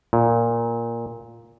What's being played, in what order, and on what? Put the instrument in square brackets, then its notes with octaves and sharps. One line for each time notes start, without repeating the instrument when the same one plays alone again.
[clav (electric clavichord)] A#2